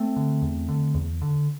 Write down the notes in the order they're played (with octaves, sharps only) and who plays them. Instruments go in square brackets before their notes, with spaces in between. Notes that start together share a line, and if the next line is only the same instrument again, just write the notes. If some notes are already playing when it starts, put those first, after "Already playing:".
Already playing: [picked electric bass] A3 C4
D3
E2
D3
E2
D3